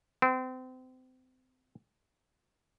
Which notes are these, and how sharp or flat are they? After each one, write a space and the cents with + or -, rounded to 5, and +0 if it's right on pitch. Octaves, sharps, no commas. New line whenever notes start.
C4 -30